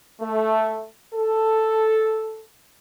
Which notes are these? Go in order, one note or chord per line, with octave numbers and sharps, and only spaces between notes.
A3
A4